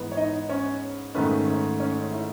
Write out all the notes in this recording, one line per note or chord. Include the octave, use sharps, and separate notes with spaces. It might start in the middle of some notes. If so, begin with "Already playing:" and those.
Already playing: G#2 E3 B3
C#5
D#4 D#5
C#4 C#5
G#2 D#3 A3 B3 C#4 B4
C#4 C#5
C#4 C#5
E4 E5